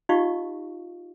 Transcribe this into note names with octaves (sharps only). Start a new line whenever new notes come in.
D#4 F4 G4 D#5 F5 C#6